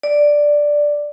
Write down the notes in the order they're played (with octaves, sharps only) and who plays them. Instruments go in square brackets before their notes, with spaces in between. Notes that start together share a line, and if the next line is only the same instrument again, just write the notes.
[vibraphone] D5